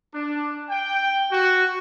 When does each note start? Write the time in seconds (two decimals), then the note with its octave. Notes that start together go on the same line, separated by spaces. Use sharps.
0.13 D4
0.69 G5
1.32 F#4